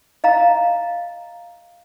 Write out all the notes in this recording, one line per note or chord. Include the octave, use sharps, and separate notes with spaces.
D#5 F5 A#5